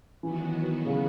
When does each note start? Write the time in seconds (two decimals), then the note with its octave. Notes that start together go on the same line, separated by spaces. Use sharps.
0.23 D#3 E3 F#3 B3 F#4
0.85 C#3